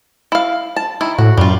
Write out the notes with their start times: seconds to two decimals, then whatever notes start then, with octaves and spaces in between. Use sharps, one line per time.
0.32 E4 F5
0.76 A5
1.01 D#3 E4
1.18 A2 F#4
1.37 F#2 G3 F4